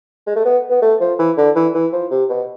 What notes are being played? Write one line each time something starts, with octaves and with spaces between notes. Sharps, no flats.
G#3
A3
B3
B3
A3
F3
E3
D3
E3
E3
F3
C3
B2